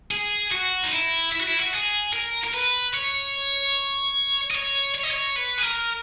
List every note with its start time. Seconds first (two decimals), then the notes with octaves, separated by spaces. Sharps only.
0.11 G#4
0.51 F#4
0.84 D#4
0.91 E4
1.32 E4
1.40 F#4
1.47 E4
1.60 F#4
1.73 G#4
2.13 A#4
2.44 A#4
2.54 B4
2.94 C#5
4.51 D#5
4.55 C#5
4.95 C#5
5.04 D#5
5.11 C#5
5.36 B4
5.58 G#4
5.63 A#4